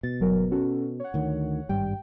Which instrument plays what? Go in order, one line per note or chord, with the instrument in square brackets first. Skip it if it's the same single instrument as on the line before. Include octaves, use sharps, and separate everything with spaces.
[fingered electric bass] B2 [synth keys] A6
[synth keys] G1 F#3 A#4
C#4 F#4 A4
C#5 F#5
[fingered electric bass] D2 D#3
[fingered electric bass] G#1 G2 G3 [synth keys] G5